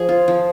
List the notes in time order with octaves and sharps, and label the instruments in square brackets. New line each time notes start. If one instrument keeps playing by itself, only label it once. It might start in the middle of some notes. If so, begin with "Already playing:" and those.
Already playing: [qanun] F3 G#4
F4
F3